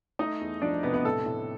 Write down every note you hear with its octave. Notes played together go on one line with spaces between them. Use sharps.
A3 D#4 D#5
E2
F3 D4 D5
C3 B3 B4
B3 B4
A2 A4
A2